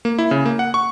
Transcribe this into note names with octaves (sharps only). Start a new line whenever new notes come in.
A#3
E4
C#3
A#3
F#5
C#6